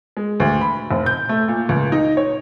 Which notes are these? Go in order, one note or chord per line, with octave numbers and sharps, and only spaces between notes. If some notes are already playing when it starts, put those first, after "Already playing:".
G#3
D2
B5
F1
G6
A3
A#2
C#2
D#4
C#5